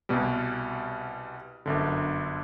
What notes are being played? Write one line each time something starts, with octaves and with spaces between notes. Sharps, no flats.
C2 B2 G3
G1 F#2 D3